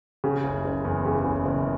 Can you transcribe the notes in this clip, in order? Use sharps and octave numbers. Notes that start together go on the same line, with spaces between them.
C#3
F#1
F#1
E2
C#3
F#1
F#1